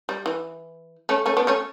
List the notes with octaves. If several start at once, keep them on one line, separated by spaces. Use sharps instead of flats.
G3
E3
A3 C#4
A3 C#4
B3 D4
A3 C#4